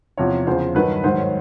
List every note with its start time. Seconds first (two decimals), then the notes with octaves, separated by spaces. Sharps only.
0.17 E2 C3 F3 C#5
0.46 E2 C#3 F3 C5
0.75 G2 D#3 F#3 B4
1.04 G#2 D#3 F#3 C5
1.18 C#5